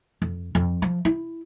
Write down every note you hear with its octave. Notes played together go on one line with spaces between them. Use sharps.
F2
F2
F3
E4